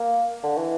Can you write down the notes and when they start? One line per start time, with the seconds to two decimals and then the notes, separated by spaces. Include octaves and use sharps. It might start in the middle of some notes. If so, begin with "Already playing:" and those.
Already playing: A#3
0.43 D3
0.57 E3